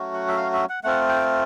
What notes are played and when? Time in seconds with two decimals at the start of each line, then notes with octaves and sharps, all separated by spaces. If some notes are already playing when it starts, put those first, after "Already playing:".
Already playing: F#3 A3 C#4 F#4
0.14 F#5
0.28 E5
0.37 F5
0.53 E5
0.69 F#5
0.84 A3 C4 F4 F#5
1.08 G5